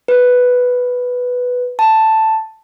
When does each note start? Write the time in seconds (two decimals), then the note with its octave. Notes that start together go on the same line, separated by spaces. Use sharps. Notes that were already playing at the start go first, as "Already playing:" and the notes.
0.08 B4
1.79 A5